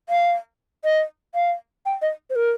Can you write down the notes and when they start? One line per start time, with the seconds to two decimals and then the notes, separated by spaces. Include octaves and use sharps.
0.09 F5
0.84 D#5
1.35 F5
1.86 G5
2.02 D#5
2.30 C5
2.36 A#4